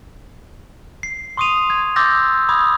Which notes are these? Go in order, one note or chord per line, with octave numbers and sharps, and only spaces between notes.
C7
C6 C#6 D#6 C7 D#7 F7
G#6
C6 D6 E6 G6 A6 A#6
B5 D6 D#6 G#6